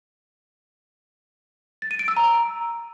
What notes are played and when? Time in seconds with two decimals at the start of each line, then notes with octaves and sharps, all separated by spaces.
1.82 A6
1.91 D#7
1.99 D7
2.08 E6
2.17 A#5